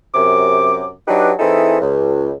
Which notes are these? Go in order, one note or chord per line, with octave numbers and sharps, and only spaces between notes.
F#2 C3 D6
F#3 D4 D#4 G4 B4
E3 C4 D#4 E4 G#4 A4
C#2